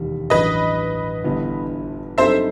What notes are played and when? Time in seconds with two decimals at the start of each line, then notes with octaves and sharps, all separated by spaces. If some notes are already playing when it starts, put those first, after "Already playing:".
Already playing: E1 D#2 D#3 G3
0.30 A1 G2 F#3 B4 D#5
1.24 G1 G2 E3 B3
2.18 G2 F#3 C4 D#4 A4 C5 E5